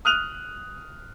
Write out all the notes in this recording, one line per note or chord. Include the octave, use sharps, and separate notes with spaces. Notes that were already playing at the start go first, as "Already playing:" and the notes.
D#6 F6 F#6 D#7 F7